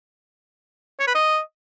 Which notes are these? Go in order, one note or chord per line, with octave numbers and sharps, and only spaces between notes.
C#5
B4
D#5